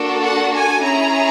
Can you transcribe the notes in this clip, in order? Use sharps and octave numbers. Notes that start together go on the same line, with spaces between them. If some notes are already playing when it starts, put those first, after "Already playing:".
Already playing: A#3 D4 F#4 A4
F#5
G#5
C#4 E4 G#4 A#5